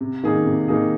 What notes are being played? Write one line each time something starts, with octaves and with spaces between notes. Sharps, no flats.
C3
D#3 A#3 D#4 G#4
C3
D#3 A#3 D#4 G#4